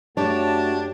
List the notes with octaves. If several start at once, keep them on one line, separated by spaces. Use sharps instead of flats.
F#2 A3 D4 F#4 G4 C#5 A5